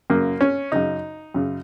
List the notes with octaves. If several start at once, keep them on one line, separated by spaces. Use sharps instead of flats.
F#2 C#3 A#3
C#4
F#2 C#3 D#4
F#2 C#3